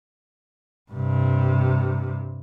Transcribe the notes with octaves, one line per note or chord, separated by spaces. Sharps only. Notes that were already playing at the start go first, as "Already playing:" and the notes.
G2 C3